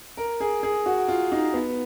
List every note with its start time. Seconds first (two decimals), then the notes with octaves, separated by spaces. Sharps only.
0.17 A#4
0.40 G#4
0.63 G#4
0.86 F#4
1.08 F4
1.32 D#4
1.54 B3